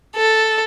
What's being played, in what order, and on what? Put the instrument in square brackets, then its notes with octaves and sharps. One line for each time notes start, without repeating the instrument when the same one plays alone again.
[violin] A4